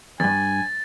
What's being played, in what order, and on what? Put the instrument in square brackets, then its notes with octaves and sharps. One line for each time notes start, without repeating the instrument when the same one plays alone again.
[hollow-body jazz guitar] E2 G2 [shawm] G#5 [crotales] A6